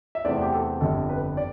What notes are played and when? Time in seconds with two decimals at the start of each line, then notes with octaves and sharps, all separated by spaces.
0.15 E5
0.24 E2 C3 E3 A3 C4 D5
0.41 G4
0.53 A4
0.80 G1 F2 D3 G3 A4
1.09 B4
1.37 D5